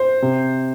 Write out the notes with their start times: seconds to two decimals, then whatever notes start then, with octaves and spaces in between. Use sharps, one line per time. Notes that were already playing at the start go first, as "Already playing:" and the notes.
Already playing: C5
0.22 C3